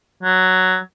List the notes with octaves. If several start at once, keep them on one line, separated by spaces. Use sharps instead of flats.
F#3